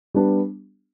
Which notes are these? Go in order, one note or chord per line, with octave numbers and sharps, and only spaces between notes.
G3 B3 D4